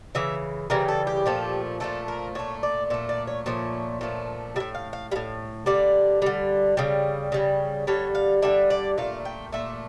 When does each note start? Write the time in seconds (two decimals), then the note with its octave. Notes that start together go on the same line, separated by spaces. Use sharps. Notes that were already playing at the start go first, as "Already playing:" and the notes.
0.15 C#3 E3 E5
0.70 C#3 E3 G3 A#4
0.88 A4
1.07 G4
1.26 A#2 F3 A3
1.80 A#2 F3 A3 A4
2.08 A#4
2.35 A#2 A3 C#5
2.63 D5
2.90 A#2 A3 E5
3.09 D5
3.27 C#5
3.46 A#2 F3 A3 C#5
4.01 A#2 F3 A3
4.56 A2 G3 E5
4.75 F5
4.93 F5
5.11 A2 G3 F5
5.66 D3 G3 D5
6.22 D3 G3
6.77 C#3 G3
7.32 C#3 G3
7.87 D3 G3 C#5
8.15 F5
8.42 D3 G3 E5
8.70 D5
8.98 A#2 A3 F5
9.25 G5
9.53 A#2 A3 E5